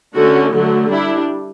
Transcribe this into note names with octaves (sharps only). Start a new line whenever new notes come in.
D3 A3 C#4 F#4
D3 F#3 A3
G3 D4 E4